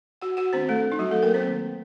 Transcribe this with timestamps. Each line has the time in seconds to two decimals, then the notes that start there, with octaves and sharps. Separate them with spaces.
0.21 F#4 F#5
0.37 F#4 F#5
0.53 D#3 A3 C4 D4 C5
0.69 A3 A4
0.92 D#4
0.99 F#3 F#4
1.11 A3 A4
1.23 A#3 A#4
1.34 C4 C5
1.46 D#3 A3 C4